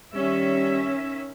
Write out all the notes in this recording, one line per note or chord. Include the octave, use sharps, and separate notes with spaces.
D#3 G3 C#4 E5